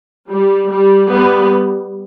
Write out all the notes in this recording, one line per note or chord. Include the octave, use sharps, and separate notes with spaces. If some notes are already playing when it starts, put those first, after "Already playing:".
G3
G3
G3 B3